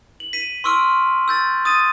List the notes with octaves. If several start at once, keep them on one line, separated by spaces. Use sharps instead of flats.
F#7
B6 D#7
C6 C#6 E6 F6 D7
E6 G6 A6
D#6 A6 D#7